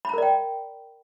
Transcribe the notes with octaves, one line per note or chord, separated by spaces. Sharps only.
A#4 D5 G5 A#5 B5